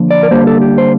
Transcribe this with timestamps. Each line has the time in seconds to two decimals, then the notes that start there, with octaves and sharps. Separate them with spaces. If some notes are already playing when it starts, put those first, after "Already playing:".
Already playing: D3 F3 A#3
0.11 D5
0.23 A#4
0.31 D3 G3 A#3 C5
0.47 A4
0.61 G4
0.78 C5